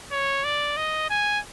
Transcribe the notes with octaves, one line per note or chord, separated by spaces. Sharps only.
C#5
D5
D#5
G#5